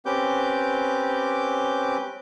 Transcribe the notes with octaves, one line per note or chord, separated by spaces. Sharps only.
C4 C#4 G4 B4 D6 G6